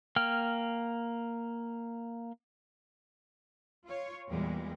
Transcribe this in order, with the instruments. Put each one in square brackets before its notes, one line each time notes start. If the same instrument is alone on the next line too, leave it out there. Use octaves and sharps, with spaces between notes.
[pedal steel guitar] A#3 G5 F6
[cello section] F4 C#5
E2 A#2 G3 G#3